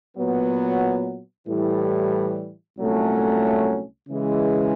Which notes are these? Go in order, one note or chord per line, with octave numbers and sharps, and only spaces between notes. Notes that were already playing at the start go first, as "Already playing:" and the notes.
A#2 F#3 B3
A2 E3 G3
C2 A#2 F#3 A3 C#4
C#3 E3 G#3